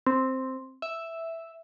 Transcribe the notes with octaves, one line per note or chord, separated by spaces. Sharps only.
C4
E5